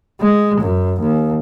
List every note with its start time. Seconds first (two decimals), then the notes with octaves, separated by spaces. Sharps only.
0.21 G#3
0.61 F#2
1.01 D#2